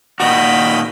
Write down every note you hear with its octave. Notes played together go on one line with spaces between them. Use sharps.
A#2 D#3 F#4 D#5 G5 B5